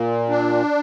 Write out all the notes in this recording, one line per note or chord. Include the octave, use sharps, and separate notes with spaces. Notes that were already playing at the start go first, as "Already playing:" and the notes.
Already playing: A#2
D4